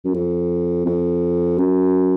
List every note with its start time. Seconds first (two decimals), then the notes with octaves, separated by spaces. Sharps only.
0.05 F#2
0.14 F2
0.86 F2
1.58 F#2